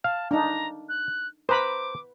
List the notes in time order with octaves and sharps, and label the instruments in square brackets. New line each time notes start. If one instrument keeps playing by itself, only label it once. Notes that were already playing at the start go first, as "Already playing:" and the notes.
[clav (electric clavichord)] F5 [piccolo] A5
[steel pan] D4 D#4 [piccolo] A#5
[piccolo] F#6
[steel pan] B4 B5 [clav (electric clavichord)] C5 A#5 [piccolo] D6